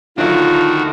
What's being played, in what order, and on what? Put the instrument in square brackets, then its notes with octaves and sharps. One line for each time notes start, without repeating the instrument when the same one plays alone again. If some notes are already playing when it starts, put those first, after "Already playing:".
[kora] D3 F#3 [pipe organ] D#3 F#4 [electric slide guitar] D4 A4 E5 [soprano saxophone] F4